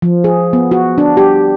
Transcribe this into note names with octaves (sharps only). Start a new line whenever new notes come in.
F3
G#4
B3
F#4
D4
G4